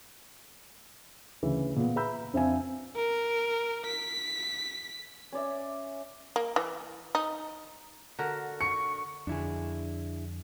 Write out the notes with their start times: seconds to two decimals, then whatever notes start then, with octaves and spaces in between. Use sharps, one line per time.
1.43 D2 C#3 E3
1.76 A#2 B3
1.96 B4 E5 A#5 B5 E6 G6
2.33 F2 C4 D4 E5 F5 G#5
2.96 A#4
3.86 B6
5.32 C#4 D5 E5
6.36 A#3
6.56 E3
7.15 D#4
8.19 D3 F#4 A#4
8.61 C#6 C#7
9.27 F2 D3 D4 E4 G#4